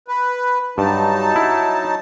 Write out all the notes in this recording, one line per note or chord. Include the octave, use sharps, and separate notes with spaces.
B4
G2 F#3 D#4 A5
E4